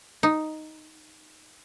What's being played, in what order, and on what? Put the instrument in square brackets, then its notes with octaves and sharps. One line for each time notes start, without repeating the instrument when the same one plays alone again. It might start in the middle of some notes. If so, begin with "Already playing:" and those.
[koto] D#4